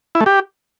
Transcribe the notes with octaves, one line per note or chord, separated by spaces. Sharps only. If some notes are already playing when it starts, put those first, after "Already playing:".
E4
A3
G4